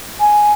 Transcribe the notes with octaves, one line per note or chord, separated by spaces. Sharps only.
G#5